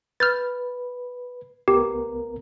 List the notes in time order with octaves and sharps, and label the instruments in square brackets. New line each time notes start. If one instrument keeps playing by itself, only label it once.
[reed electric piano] B4 [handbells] F6 G6 A6
[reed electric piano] C2 B3 A#4 [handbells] G4